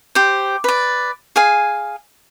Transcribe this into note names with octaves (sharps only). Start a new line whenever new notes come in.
G4 C5
B4 D5
G#4 F5 G#5